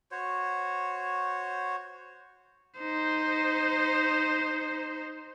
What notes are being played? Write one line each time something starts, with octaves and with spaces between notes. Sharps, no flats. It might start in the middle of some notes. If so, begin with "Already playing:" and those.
F#4 C5 C#5
D#4 C5